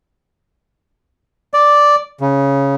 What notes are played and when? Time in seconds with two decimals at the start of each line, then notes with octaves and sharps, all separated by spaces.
1.54 D5
2.21 C#3